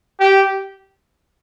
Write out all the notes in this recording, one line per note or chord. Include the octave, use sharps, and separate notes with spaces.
G4